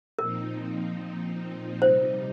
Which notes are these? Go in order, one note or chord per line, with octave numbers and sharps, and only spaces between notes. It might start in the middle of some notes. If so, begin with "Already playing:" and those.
A#2 F3 C4 D#4 A#4
C3 G3 D#4 C5